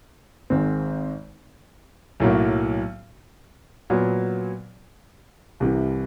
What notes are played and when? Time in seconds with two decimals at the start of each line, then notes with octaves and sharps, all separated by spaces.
0.50 G#1 G#2 D#3 G#3 C4
2.20 B1 A2 F#3 A#3
3.90 A#2 F#3 B3
5.60 C2 C3 E3